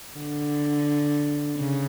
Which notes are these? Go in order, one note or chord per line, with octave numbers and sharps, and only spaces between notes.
D3
C#3